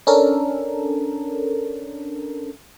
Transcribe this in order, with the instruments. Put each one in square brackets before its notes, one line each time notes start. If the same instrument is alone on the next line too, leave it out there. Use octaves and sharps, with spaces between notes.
[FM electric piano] C#4 D4 A4 A#4